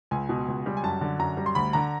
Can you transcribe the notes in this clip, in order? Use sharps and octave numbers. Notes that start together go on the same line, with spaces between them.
C#2 G#5
B2
C#2
G3
G#5
F#2 A5
D3
F#2 A#5
G3
C6
D2 B5
D3 A#5